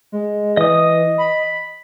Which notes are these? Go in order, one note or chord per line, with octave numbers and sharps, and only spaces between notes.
G#3
E3 D#5 D#6
B5